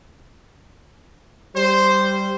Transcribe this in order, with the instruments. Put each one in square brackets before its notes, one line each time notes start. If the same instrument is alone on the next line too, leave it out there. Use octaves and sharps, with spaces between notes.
[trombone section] G3 [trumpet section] C5